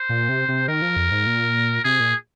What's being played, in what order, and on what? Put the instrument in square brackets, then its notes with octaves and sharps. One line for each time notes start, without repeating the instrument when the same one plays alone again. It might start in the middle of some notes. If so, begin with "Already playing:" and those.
Already playing: [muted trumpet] C5
[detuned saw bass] A#2
C3
C3
[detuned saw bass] D#3 [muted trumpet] A#4
[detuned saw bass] F3
F2
G#2
A#2
[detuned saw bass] C3 [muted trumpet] G#4
[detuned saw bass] A#2